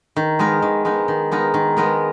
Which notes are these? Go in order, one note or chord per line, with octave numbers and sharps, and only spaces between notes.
D#3
G#3 B3 D#4 A#4
D#3
G#3 B3 D#4 A#4
D#3
G#3 B3 D#4 A#4
D#3
G#3 B3 D#4 A#4